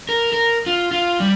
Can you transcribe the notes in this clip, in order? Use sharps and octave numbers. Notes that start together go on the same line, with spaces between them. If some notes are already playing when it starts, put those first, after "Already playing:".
A#4
A#4
F4
F4
G3